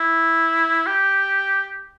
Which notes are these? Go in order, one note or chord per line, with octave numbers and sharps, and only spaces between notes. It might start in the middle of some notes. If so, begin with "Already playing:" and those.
Already playing: E4
G4